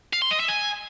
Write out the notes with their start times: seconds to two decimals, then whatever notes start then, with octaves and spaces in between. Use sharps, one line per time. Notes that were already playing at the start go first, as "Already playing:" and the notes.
0.13 F5
0.22 C6
0.31 D#5
0.40 E5
0.49 G#5